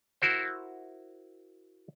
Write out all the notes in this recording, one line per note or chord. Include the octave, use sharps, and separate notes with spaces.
E4 F#4 A#4 C5